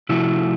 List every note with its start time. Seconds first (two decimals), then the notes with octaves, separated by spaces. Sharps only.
0.09 C3 F3 A3 E4 F#4